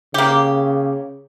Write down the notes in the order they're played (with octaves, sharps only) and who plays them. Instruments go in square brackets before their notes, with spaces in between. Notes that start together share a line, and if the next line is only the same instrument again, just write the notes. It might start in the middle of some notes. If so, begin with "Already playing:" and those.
[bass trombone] C#3 [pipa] A#3 G4